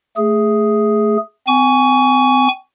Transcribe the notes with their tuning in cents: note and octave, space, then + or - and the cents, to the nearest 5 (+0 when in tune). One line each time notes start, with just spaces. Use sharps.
A3 +0 G#4 +0
C4 -40 G#5 +0 C#6 +25